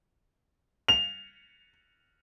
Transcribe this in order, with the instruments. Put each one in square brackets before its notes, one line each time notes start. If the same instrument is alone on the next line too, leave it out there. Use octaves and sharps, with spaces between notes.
[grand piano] F7